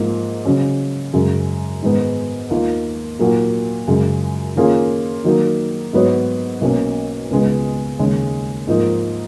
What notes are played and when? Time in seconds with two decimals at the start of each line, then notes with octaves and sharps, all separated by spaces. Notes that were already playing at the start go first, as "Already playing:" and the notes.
Already playing: G#2 F3 A#3
0.45 C#3 F#3 C#4
1.13 F#2 C#3 G#3
1.82 G#2 D#3 G#3 B3 D#4
2.50 D#2 D#3 A#3 F4
3.19 A#2 F#3 A#3 D#4 F#4
3.88 F#2 C#3 G#3
4.56 D#3 A#3 C#4 F4 G#4
5.24 D#3 F#3 A#3 D#4
5.93 G#2 F#3 B3 F#4 C#5
6.61 B1 B2 A#3 C#4
7.30 C#2 C#3 G#3 B3
7.99 D#2 C#3 G#3 C#4
8.67 G#2 F3 A#3 D#4 A#4